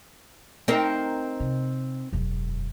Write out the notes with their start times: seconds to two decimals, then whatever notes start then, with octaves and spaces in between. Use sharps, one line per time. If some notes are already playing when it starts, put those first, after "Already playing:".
0.68 C4 D#4 A#4
1.40 C3
2.13 E1 F#2